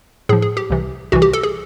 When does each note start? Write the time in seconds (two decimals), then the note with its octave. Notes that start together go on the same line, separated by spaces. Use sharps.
0.29 A2 G#4
0.33 F3
0.42 G#4
0.57 G4
0.70 C2 C3 E3
1.12 C2 C3 E3 F#4
1.22 G4
1.33 A4
1.43 G#4